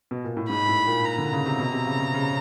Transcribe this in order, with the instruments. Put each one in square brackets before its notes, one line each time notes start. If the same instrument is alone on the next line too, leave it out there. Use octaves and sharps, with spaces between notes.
[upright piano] B2
A#2
A2
[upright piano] G#2 [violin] B5
[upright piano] A2
A#2
[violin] A#5
[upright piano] D3
C#3
C3
B2
C3
C#3
C#3
C#3